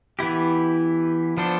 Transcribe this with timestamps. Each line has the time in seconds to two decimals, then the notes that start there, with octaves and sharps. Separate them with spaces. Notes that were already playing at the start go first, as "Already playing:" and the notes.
0.19 E3 B3 E4 G4
1.37 F3 B3 D4 A4 C5